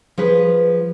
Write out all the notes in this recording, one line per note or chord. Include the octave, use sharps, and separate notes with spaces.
F3 G#4 B4